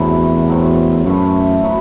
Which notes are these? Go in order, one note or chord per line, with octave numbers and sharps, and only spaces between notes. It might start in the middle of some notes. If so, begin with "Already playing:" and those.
Already playing: E2 C3 F#3 A3 B3 D4
A2 F#3 C4
F#2 A2 E3 A3
F#3 B3